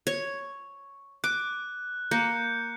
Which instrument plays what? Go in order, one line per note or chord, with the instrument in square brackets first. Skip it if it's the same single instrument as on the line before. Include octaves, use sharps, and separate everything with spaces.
[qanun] C#5
[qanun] D6 [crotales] F#6
[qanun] A#3 [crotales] G6 C#7